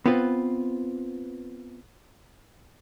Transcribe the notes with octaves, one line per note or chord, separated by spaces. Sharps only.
B3 C4 F4 B4